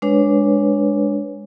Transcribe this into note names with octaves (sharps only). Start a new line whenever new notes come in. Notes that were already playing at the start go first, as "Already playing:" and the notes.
G#3 D4 B4 C#5